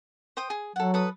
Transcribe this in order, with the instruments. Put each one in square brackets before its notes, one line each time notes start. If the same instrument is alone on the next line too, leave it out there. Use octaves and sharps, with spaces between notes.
[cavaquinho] C5 G5 D#6
G#4
[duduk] F#3 [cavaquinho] A4 F#5
[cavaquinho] A4 B4 D#6